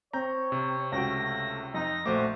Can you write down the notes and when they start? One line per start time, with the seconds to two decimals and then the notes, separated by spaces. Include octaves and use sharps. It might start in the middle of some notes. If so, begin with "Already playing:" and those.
0.13 C4 C#5 A#5 G6
0.52 C3
0.92 C#2 A3 F#4 G5 A#6
1.74 F2 D#4 A#6
2.06 A#1 A3 F#4 C5 D6